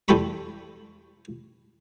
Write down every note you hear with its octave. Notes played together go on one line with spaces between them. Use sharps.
E2 G3 A4 G5 B5 C#6